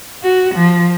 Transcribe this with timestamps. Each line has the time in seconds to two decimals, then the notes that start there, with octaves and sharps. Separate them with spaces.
0.23 F#4
0.55 F3